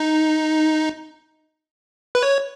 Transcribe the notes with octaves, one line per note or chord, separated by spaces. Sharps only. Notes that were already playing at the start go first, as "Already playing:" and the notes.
Already playing: D#4
B4
C#5